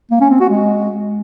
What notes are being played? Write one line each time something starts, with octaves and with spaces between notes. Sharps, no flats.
A#3
C#4
C4
F#4
G#3